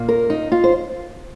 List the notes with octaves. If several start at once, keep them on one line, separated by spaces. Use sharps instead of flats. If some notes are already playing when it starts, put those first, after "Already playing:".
Already playing: A#2 A#3
A#4
D#4
F4
C5